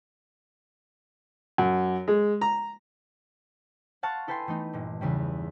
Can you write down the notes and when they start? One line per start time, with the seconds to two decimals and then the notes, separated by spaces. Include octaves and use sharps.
1.58 F#2
2.08 G#3
2.41 A#5
4.03 F5 F#5 A5 C6 C#6 F6
4.27 E4 A4 B4 G5 G#5 C6
4.47 E3 A3 B3 D#4
4.73 G1 A#2
5.01 E2 C#3 G3